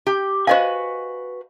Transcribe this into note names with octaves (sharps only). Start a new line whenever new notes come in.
G4
F#4 B4 C5 D#5 F5 G#5